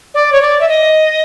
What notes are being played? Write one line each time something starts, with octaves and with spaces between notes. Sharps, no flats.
D5
C#5
D5
E5
D#5